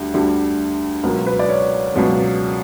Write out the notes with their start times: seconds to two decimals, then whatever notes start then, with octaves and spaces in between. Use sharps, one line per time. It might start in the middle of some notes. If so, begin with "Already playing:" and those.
Already playing: D2 D3 G3
0.14 D2 D3 G3
1.04 C#2 B2 F#3 A#4
1.26 B4
1.39 D5
1.48 C#5
1.94 C#2 B2 F#3